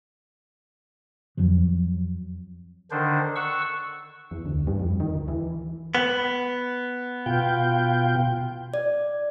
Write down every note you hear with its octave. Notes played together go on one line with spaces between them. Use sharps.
F2 F3 F#3
D3 D#3 D4 C5
F#5 C#6 E6
E2
D2
G2
F2
D#3
D2
E3
B3
B2 F4 G5
D5